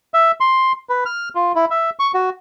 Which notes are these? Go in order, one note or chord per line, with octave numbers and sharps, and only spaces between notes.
E5
C6
B4
F6
F4
E4
E5
C#6
F#4